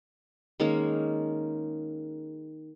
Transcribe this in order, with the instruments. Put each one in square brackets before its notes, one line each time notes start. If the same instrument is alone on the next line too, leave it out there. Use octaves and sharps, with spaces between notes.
[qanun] D#3 G#3 A#3 C#4